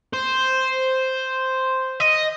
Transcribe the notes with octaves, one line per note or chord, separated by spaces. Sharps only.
C5
D#5